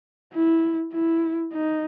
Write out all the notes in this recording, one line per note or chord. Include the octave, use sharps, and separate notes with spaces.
E4
E4
D#4